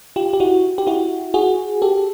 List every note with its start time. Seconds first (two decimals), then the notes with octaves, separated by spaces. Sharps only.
0.16 F4 G4
0.33 G4
0.40 E4 F#4
0.78 G4
0.87 E4 F#4
1.34 F#4 G#4
1.82 G4 A4